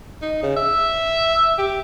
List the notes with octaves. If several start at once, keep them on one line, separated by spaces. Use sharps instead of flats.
D#4
C#3
E5
G4